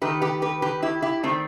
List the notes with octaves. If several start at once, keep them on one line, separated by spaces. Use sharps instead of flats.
D#3 A3 G4 B4
G4 B4
G4 B4
G4 B4
E4 G4
E4 G4
D#3 G3 A3 C4